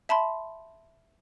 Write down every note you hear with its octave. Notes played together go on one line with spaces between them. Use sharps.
E5 A5 B5 C6